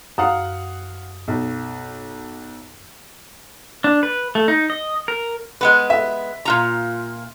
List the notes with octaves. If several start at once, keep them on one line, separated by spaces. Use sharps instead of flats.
F#2 F5 F#5 D#6
B1
D4
B4
A3
D#4
D#5
A#4
G#3 B3 B4
E5
A#2 F4 A#5